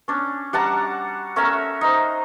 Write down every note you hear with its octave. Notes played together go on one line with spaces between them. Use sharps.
C#4 D4
G3 F#5 A5 A#5
A3 C#4 A#4 E5
D#4 C5